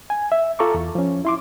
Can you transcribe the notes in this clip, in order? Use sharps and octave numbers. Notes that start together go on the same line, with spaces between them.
G#5
E5
F4 A4 A#5 C#6 D6
E2
F3 C#4
E4 C6 D6